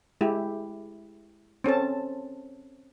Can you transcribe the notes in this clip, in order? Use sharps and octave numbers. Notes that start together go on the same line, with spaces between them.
G#3 E4 G4
C4 C#4 A4 A5